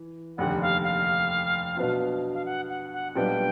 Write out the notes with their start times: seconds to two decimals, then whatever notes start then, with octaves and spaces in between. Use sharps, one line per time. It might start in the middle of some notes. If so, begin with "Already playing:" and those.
Already playing: E3
0.37 F1 D#2 D3 F#5
0.61 F5
0.84 F5
1.76 B2 F#3 B3 D4 F4
2.34 F5
2.45 F#5
2.69 F#5
2.92 F#5
3.15 B1 A#2 G3 B3 D4 G5